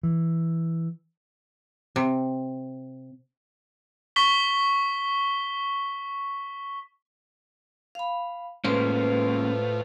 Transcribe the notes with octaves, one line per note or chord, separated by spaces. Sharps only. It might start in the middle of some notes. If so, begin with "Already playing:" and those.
E3
C3
C#6 B6 G7
F5 B5
A2 G#3 A#3 C#4 F4 B4 C5